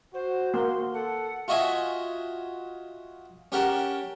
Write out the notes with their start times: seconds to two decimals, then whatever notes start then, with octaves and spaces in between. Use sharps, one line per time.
0.14 F#4 C5
0.54 A#3 C6
0.94 A4 F#5
1.48 F4 F#4 D#5 E5 G#5
3.52 C#4 G4 A#4 F#5 A5